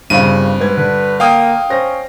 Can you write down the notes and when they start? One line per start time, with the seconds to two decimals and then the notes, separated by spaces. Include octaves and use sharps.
0.10 G1 G2 C#3 C4 D#7
0.59 G#2 B4 G#6
0.77 D3 B4
1.20 A#3 F5 G5 D#6
1.70 C#4 C5 A#6